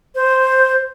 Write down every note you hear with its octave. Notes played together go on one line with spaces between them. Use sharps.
C5